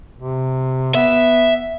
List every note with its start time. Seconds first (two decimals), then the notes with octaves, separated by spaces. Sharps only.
0.19 C3
0.95 B3 E5